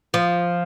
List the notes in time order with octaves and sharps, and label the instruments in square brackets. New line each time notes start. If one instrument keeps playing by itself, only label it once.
[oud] F3